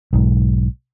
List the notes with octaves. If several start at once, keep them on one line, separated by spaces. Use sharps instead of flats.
B1 G#2